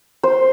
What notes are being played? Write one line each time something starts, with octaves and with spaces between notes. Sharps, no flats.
C5